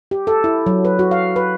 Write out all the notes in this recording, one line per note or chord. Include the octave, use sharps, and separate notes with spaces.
G4
A4
E4
F#3
B4
F#4
F5
B4